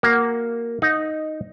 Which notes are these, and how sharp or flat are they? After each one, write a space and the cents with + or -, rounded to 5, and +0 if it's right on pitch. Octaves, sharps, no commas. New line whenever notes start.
A#3 +0 F#4 +0
D#4 +0 F#5 -45